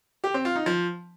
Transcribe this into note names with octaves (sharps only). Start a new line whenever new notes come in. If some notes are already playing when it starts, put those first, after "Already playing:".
G4
C4
F4
D#4
F3